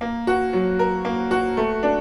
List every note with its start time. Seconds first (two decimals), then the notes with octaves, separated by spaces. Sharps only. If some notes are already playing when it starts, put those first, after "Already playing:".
0.01 A#3
0.27 F#4
0.53 F#3
0.79 A#4
1.05 A#3
1.31 F#4
1.57 A3
1.83 D4